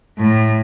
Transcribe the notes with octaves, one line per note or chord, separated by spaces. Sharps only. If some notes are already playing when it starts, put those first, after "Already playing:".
A2